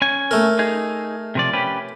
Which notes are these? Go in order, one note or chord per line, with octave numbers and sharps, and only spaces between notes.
C#4 G#5
A3 A#4
D#4 G#4
C3 F3 D5
C#4 G4 B4